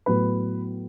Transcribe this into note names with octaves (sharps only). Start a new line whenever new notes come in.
A2 F#3 B3 B4